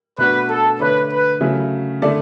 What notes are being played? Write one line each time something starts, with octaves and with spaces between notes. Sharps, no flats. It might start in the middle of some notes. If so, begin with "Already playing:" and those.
B2 A3 D4 F#4 B4
A4
D3 A3 D4 A4 B4 C#5
B4
C#3 F#3 A3 E4
D3 A3 E4 A4 D5